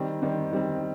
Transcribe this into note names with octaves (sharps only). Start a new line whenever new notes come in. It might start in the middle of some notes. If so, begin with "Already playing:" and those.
Already playing: D#3 G3 C4
D#3 G3 C4
D#3 G3 C4